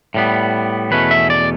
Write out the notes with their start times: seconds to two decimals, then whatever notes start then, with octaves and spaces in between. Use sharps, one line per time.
0.14 A2 G3 B3
0.91 E2 B2 A3 C#4 B4
1.11 E5
1.30 D5